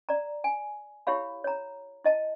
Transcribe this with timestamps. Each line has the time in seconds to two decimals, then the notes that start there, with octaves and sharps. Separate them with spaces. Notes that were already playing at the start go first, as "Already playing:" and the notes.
0.09 D5 A#5
0.44 G#5
1.07 E4 G4 C#5 F5 B5
1.44 C#5 A#5
2.04 E4 D#5 A5